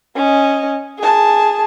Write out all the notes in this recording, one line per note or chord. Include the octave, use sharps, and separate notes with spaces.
C#4 D#5
G#4 A5